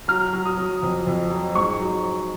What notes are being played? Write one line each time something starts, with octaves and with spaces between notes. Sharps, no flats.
F#3 F6
F#3
D#6
F#3
F2
F2
F#3
G#2 C#6
F#3